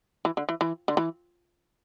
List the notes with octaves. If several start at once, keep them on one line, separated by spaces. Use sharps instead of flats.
E3
D3
E3
E3
D3
E3